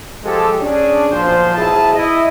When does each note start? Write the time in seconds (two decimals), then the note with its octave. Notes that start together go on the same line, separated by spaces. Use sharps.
0.24 F3 G#3 G4 A4
0.60 C#4 D4 G#4
1.11 B1 A#2 F3 F4 C5
1.55 B1 G#2 E4 G#4 D#5 A5
1.94 E4 D#5